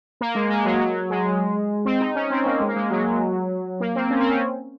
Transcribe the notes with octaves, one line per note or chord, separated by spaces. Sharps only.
A#3
G#3
G#3
F#3
F#3
G#3
C4
D#4
C#4
C4
A#3
G#3
A#3
G#3
F#3
A#3
C4
C#4
C4
C#4